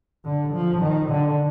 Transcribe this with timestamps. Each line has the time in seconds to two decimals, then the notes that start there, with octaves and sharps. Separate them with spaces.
0.25 D3
0.54 F3
0.82 D#3
1.10 D3